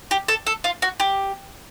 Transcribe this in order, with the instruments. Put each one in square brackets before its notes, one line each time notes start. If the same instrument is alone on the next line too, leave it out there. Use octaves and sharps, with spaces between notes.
[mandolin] G4
A4
A4
F4
F#4
G4